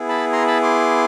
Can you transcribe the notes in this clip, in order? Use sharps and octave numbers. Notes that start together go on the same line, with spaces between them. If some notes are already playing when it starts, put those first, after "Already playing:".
Already playing: B3 E4 G#4
A5 B5
A#5 C6
A5 B5
C6 D6